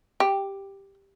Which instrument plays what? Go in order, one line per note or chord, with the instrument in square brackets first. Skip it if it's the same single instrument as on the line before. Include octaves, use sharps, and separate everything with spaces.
[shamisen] G4